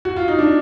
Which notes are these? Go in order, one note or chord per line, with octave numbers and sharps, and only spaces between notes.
F#4
F4
D#4
D4